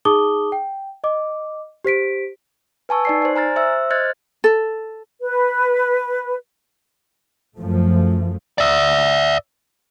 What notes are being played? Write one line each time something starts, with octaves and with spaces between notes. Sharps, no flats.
D#4 G#4 A5 D6 D#6 G7
G5
D#5 D6
G4 C5 B6 D7
B4 G#5 A5 C#6 E6
D#4 D5 C7
C5 D5
G#5 A#5 F6 A6
C5 E5 E6
C5 D#5 F6 F#6 G#6 A6
A4
B4
F#2 F3 A3
D5 E5